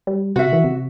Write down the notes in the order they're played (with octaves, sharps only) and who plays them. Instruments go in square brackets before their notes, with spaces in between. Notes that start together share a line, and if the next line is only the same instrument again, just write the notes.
[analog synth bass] G3
[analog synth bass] C3 [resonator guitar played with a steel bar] F#4 E5
[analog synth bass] E3
C3